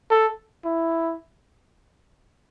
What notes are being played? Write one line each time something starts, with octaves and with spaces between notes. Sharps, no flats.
A4
E4